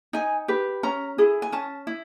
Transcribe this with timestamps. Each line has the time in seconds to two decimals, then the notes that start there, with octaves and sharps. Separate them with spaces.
0.13 D#4 G#5
0.48 G4 B4
0.83 C#4 A#5
1.18 E4 G#4
1.42 G#5
1.52 C#4 A5
1.87 E4